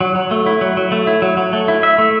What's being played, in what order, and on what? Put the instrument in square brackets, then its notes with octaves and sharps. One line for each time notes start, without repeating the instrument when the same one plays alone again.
[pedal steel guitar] F#3
F#3
A3
E4
F#3
F#3
A3
E4
F#3
F#3
A3
E4
E5
A3